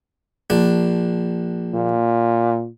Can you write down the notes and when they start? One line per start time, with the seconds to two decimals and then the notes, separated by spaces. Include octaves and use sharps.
0.50 A#1 D4
1.74 A#2